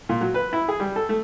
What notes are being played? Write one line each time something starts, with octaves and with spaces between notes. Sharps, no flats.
A#2
F#3
B4
E4
G#4
G3
A4
A3